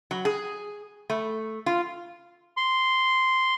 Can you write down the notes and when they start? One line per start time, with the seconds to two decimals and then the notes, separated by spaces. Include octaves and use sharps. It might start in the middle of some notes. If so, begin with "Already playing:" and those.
0.11 F#3
0.25 G#4
1.10 A3
1.66 F4
2.57 C6